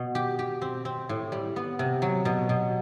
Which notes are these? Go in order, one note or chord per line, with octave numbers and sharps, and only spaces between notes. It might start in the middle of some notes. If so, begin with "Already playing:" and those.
Already playing: B2 B3
G4
G4
C4
C4
A2
G3
B3
C3
F#3
B2
B2